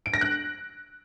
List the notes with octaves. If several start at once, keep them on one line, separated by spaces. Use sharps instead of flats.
D7
A#6
F#6